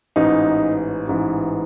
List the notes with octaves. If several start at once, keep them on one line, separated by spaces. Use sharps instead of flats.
A1 G#2 E3 D#4
A1 G#2 E3